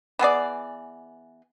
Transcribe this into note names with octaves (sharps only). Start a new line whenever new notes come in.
E3 B3 G#4 D5